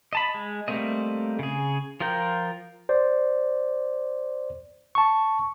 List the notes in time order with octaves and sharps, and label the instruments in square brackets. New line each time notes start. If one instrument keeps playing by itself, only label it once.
[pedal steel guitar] D#5 A5 B5
G#3
G3 A3 A#3 C4 D#5
C#3 G#4
F3 F4 A#4 G5
[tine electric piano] C5 D5
A5 C#6